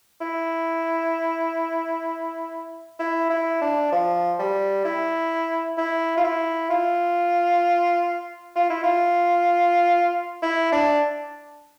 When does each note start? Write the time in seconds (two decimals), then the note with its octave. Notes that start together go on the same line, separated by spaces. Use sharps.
0.21 E4
2.99 E4
3.30 E4
3.62 D4
3.92 F3
4.39 G3
4.85 E4
5.78 E4
6.17 F4
6.24 E4
6.70 F4
8.56 F4
8.70 E4
8.84 F4
10.42 E4
10.72 D4